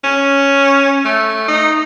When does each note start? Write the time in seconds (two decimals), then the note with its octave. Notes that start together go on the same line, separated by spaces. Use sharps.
0.04 C#4
1.05 A3
1.48 D#4